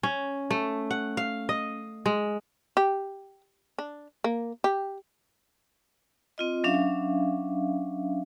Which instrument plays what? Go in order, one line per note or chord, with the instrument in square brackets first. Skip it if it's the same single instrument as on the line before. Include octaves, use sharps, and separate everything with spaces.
[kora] C#4
A3
F#5
F5
D#5
G#3
[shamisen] G4
D4
A#3
G4
[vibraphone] C4 F4 D#5
F#3 C#4 D4 E5 F5